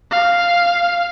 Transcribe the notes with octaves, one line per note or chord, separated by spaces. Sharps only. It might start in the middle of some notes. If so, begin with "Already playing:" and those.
F5